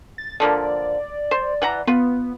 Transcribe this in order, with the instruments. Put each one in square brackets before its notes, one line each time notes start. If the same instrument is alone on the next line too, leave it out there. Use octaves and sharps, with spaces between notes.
[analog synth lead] A6
[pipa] D3 F3 A#3 [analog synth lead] D5
[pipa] C5
E3 F#5 A#5
[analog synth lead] B3 [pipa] F4 B4